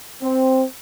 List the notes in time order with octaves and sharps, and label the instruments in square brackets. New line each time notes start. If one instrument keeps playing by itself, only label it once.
[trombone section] C4